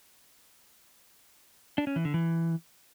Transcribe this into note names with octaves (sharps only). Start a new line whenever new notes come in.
D4
C#4
E3
D3
E3